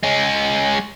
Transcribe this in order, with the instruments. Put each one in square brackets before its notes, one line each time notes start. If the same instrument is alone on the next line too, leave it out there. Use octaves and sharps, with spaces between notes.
[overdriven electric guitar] G#3 C#4